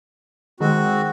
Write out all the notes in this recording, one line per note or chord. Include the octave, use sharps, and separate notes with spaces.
D#3 G#3 C4 F#4